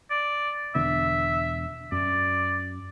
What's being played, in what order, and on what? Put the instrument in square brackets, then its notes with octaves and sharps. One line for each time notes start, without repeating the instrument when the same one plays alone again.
[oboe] D5
[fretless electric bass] E1 D3 B3 [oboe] E5
[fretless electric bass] F#2 [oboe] D5